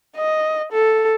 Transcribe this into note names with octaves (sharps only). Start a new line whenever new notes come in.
D#5
A4